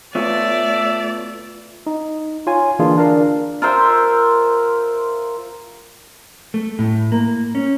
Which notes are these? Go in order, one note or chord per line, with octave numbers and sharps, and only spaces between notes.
A3 B3 F4 C#5 D5 E5
D#4
F4 C#5 G#5
D3 E3 A#3 D4 F4 G#4
D4 A#4 F5
F4 A#4 C5 E5
A3
A2
A#3
C#4